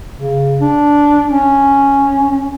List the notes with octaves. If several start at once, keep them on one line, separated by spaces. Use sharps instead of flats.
C#3
D4
C#4